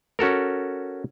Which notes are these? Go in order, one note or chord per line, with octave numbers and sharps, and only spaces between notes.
C#4 F#4 A4 A#4